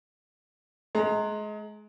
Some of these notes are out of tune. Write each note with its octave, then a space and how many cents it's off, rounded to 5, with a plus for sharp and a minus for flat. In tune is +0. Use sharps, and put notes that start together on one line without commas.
G#3 +30 A#5 -20